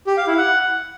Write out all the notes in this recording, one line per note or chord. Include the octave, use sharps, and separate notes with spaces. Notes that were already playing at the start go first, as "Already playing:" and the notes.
G4
F5
E4
F#5